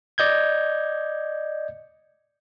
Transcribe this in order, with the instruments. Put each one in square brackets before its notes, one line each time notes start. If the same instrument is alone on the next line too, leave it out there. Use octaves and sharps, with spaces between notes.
[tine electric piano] D5 D#5 G6 G#6